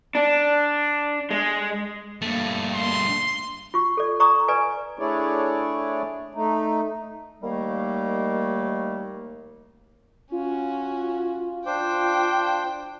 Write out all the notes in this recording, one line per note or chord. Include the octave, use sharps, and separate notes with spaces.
D4
G#3
G2 A3 A#3
C6
F4 C#6
A4 D5
D5 A#5 C#6 D#6
B4 D5 G#5
A3 D4 E4 G#4 C#5 D5
A3 D#4
D#2 D#3 G3 A3 A#3
C#4 F4 F#4
D4 C5 G5 D6